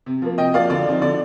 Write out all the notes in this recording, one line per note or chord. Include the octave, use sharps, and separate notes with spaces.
C3
F3 A#3
C3 D#5 G5
F3 A#3 D5 F5
D3 D5
F3 C4 D#4
D3 D5